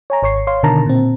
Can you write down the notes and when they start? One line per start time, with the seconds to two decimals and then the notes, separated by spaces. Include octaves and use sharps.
0.10 C#5 G#5 A#5
0.22 G#1 C#5 C#6 C7
0.47 C#5 F5 C6
0.63 B2 D3 D#3 A#4 A5 A#5
0.86 A#2 C4